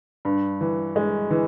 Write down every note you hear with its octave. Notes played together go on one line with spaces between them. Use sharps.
G2
E3
G#3
E3